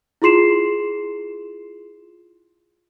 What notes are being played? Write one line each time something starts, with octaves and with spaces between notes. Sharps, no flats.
E4 F4 G#4 C6 C7 E7